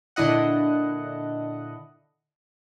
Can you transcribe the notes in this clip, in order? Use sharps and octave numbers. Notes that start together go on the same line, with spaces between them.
A#2 D3 D4 E4 D#5 F#5